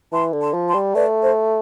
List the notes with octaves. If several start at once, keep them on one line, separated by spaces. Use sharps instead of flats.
E3 A5 C6
D3
A5 C6
F3
A5 C6
G3
A3 B4 D5
C5